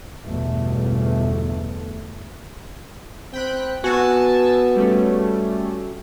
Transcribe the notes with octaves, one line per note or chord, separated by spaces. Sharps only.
G1 E2 B2 A3
C4 G5 B5 F#6
B3 F#4 G#5 A5 E6
G3 A3 C#4